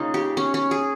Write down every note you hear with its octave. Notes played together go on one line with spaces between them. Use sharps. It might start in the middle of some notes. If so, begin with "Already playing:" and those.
Already playing: C#3 A#3 D#4 F4
G4
C#4
C#4
G#4